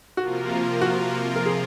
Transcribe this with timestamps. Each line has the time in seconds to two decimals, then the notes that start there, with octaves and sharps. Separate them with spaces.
0.17 C3 F3 A#3 F4 F#4 A#4
0.81 F#4
1.36 A#4
1.46 G#4